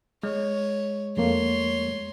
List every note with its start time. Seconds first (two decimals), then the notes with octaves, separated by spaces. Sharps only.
0.23 G#3 C#5
1.17 F2 A3 A#3 C#5 C6